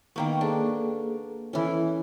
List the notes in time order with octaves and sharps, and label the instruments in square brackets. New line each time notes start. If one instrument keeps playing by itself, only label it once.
[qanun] D#3 A#3 B3 [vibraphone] G5 C#6
[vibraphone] A#3 G#4 A4 [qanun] D4
[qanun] E3 C#4 [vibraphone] E4 A4